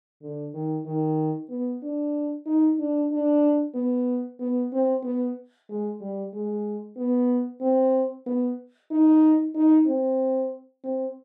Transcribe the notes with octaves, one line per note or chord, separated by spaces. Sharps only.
D3
D#3
D#3
B3
D4
D#4
D4
D4
B3
B3
C4
B3
G#3
G3
G#3
B3
C4
B3
D#4
D#4
C4
C4